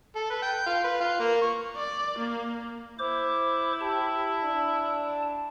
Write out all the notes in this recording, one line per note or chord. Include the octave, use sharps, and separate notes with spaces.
A4
B4
G5
F4
B4
F4
A#3
C#6
D5
A#3
E4 C5 D6
G4 A5
D4